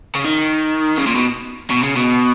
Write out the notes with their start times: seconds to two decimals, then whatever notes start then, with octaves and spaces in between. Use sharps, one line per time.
0.15 C#3
0.24 D#3
0.98 C#3
1.07 A#2
1.16 B2
1.71 B2
1.84 C#3
1.97 B2